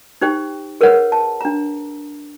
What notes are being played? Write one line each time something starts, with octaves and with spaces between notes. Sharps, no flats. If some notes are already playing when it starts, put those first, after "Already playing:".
D#4 G4 C5 G5
G#4 A#4 B4 C#5 F#5
A5
D4 A#5